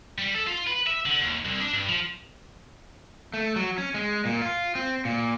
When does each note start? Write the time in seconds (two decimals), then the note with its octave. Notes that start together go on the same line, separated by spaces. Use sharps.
0.18 G3
0.34 A4
0.47 F4
0.67 B4
0.87 E5
1.06 D3
1.21 D#2
1.45 C2
1.60 D4
1.73 G2
1.89 F3
3.34 A3
3.56 F#3
3.78 C#4
3.94 G#3
4.25 A#2
4.42 F4
4.75 C4
5.05 A#2